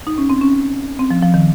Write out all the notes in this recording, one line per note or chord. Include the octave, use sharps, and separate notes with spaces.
D#4
C#4
C4
C#4
C4
F3
F3
D#3